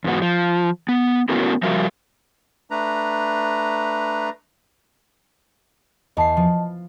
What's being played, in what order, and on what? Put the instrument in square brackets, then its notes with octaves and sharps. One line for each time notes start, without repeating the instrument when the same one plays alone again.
[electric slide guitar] E2 G#2 B3 F#4
F3
B3
A3 B3 C#4 E4 F#4 A#4
F3 G3 F#4 A#4 E5 F5
[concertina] A3 D4 B4 A#5
[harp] E2 C7 [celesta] D#5 A5
[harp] F3